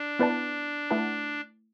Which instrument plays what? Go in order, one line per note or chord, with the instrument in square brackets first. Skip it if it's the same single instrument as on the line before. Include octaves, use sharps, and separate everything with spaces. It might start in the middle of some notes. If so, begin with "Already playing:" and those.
Already playing: [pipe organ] D4
[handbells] B3 E4 B4 D5 A5
A3 E4 B4 F#5 A5